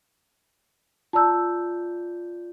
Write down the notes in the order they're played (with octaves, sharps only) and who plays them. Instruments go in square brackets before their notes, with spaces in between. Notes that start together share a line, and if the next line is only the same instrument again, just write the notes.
[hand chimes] F4 D5 G6 [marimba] A5 A#5 E6